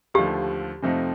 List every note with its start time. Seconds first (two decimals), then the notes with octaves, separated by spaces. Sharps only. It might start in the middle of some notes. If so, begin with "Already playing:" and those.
0.14 D#2 D3 F3 A3 G4
0.83 F2 C3 F3 A3 D#4